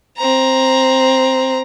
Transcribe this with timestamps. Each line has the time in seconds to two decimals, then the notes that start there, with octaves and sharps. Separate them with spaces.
0.18 C4 A#5